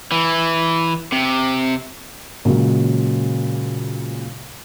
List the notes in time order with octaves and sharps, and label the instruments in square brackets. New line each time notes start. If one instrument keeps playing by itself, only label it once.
[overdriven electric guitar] E3
C3
[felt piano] A#2 C#3 F#3 G#3